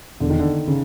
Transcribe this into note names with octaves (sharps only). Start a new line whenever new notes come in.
E1 D3
D#3
D3
C#3